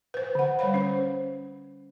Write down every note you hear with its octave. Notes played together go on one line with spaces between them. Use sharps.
B4 C5
D3 F#5
G3 B4 C#5 F5 B5
C#4 C5